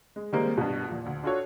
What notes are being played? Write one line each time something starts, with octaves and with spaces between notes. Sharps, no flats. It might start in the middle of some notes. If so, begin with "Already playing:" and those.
G#3
D#3 G3 G#3 A#3 C4
G2 B2
E2 A#2
D2
D4 F4 F#4 A4 C#5